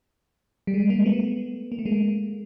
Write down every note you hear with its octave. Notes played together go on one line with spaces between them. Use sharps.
G3
G#3
G#3 A#3
A3 B3
A#3
A3
G#3 A#3